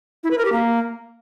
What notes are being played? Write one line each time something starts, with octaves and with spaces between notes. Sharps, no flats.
E4
B4
A#4
G4
A#3